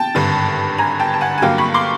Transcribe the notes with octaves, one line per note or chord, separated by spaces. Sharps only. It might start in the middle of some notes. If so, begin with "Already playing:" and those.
Already playing: G5 A5
G#1 G2 D3
G#5 A#5
G5 A5
A5
F#5 G#5
G#5
G2 D3 F#3 A#3 F5 G5
B5 C#6
C6 D6